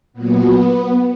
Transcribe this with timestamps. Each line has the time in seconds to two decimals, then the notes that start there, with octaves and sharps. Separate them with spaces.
0.13 A#2 F#3 B3